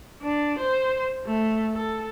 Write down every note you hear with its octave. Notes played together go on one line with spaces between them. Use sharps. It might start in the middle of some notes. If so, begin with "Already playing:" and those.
D4
C5
A3
A4